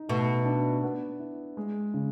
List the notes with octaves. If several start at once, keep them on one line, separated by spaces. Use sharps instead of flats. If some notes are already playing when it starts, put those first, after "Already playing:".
Already playing: D#4
B2 A3
D4
B3
E4
G#3
C#3